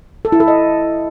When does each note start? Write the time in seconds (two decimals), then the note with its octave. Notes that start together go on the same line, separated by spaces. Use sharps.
0.25 A4
0.32 E4
0.40 A4
0.48 D#5